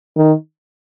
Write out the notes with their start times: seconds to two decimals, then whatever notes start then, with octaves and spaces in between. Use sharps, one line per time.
0.16 D#3